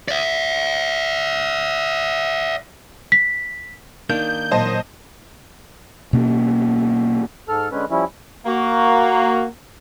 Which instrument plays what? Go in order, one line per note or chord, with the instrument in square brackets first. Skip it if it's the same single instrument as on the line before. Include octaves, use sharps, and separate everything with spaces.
[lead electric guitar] D5 E5
[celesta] B6
[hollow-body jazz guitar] D#3 A#3 D4 [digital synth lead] G6
[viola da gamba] A#2 F#3 [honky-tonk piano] C5 A5 [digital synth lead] D#5
[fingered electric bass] B2 A#3 C#4
[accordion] G#2 A4 F6
D3 G#3 C#4 B4
F3 G3 C#4 E4
[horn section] A#3 F#4